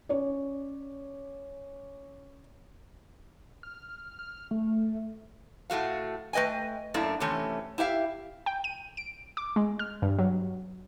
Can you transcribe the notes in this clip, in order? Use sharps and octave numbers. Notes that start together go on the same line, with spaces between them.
C#4 C#5 D5
F6
F6
A3
A2 A3 F#4 F5
A3 B4 D#5 G5 G#5
F#2 A3 A#3 D4 E4
C3 E3 A3 C#4
E4 G4 E5 F5
G5
D#7
D7
D6
G#3
F6
G2
F#3